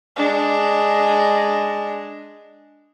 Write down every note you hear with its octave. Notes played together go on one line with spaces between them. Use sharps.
G#3 D4